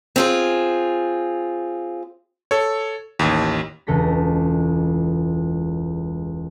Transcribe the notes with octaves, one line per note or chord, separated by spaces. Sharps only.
C4 F4 G#4
A4 C#5
A1 D#2
E1 C#2 A4 A#6 B6